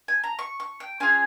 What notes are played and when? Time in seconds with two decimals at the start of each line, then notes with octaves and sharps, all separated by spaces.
0.08 G#5
0.24 A#5
0.39 C#6
0.60 C#6
0.80 G5
1.00 C#4 F4 G#4 G#5